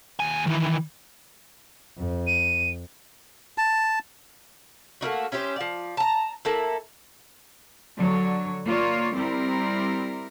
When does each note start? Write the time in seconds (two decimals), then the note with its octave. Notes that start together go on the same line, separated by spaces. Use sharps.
0.20 D#2 G#5
0.47 D#3 E3
1.98 F2
2.27 D#7
3.58 A5
5.01 A3 A#3 D#4 F#4
5.32 C#4 E4 G4 C5
5.56 F3 D5
5.97 A5 A#5
6.45 A#3 E4 A4
7.97 D3 F#3 C#5
8.66 A#3 F4 C#5 D5
9.15 G3 C4 E4 A#4